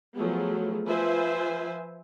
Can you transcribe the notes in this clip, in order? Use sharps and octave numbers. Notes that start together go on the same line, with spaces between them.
F3 F#3 A3 B3 G#4
F3 F4 B4 C5 E5 G#5